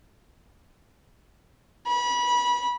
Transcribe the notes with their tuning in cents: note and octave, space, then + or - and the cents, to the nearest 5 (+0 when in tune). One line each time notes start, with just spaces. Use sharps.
B5 -25